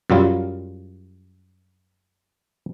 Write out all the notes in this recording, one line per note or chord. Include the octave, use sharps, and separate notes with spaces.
F#2 F#3 G3 F4